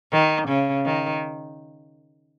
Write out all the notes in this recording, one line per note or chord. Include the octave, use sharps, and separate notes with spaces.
D#3
C#3
D#3